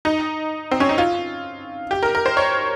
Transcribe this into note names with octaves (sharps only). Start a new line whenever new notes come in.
D#4
C4
C#4
D#4
F4
G4
A#4
A#4
C5
C#5